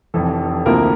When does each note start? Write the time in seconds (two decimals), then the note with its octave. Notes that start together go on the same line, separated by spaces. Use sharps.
0.14 F1 F2 E3 A4
0.66 D2 C3 F3 A#3 E4 A#4